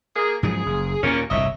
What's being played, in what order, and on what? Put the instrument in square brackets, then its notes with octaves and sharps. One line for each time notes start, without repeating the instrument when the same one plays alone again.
[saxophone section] A#3 G#4
[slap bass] G#2 F3 F#3 [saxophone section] G#4
[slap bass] F#1
[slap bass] D#2 A#2 [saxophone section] A#3 C#4
[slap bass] G1 C2 A2 [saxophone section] C#5 D#5 E5